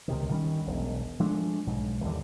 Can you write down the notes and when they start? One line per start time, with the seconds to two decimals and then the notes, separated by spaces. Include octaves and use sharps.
0.08 C#2 C3 D#3
0.30 D#3 G3 C#4
0.66 E1 B1
1.20 F3 G#3 A3 D4
1.67 B1 G#2
2.04 D#2 D3 E3 G3